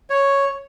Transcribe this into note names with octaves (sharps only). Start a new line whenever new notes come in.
C#5